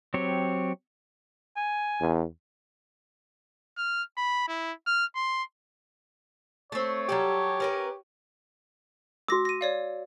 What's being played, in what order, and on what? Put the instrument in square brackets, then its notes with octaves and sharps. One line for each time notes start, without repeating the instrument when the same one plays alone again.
[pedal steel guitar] F#3 C4 G4 C#5
[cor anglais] G#5
[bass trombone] E2
[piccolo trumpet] F6
B5
E4
F6
C6
[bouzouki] A3 C4 [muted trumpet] C#5
[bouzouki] F#3 G3 A4 [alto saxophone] G4
[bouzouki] C#4 A#4 B4
[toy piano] F#4 E6 [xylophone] D6 A#6
[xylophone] A#6 D#7
C#5 D5 F5